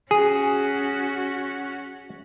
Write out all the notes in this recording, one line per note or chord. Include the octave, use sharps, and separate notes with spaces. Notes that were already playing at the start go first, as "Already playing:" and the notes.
C#4 F#4 G#4